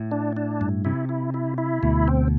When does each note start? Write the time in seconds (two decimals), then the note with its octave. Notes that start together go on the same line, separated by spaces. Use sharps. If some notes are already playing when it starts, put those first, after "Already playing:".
Already playing: A2
0.11 D4
0.37 D4
0.61 G2
0.85 C3 E4
1.09 E4
1.34 E4
1.58 E4
1.83 D2 B2
2.08 C4